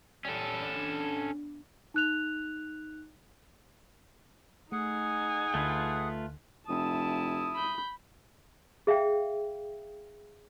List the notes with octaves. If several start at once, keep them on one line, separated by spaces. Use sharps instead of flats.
E2 G3 C#4 A4
B3 D4
D#4 F#6 F7
A3 D#4 G#4 F#5 G#5 C#7
D2 D3 A3 F4 B4
F1 E4 A5 D#6
B5 G6
G#4 E5 F5 G5